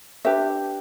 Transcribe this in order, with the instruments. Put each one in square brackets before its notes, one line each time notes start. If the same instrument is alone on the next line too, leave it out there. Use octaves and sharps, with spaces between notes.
[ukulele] D4 G4 B4 E5